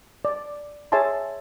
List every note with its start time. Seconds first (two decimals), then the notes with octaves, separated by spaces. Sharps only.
0.25 D5
0.92 G#4 C#5 E5 G#5 A5 C6